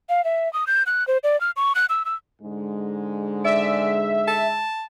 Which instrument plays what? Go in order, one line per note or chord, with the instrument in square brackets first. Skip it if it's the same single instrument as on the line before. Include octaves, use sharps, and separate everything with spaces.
[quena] F5
E5
D#6
G6
F#6
C5
D5
F6
C#6
F#6
E6
E6
[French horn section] G#2 D3 G#3
[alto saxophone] D5 [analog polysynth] E5
[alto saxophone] A5